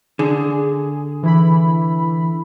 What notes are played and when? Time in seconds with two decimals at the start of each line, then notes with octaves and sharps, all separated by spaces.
0.19 D3 G#4
1.23 E3 E4 B5